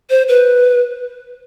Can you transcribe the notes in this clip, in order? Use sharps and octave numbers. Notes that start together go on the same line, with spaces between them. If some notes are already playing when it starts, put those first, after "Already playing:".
C5
B4